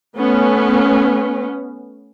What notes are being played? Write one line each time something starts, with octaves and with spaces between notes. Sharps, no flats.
A3 B3 C#4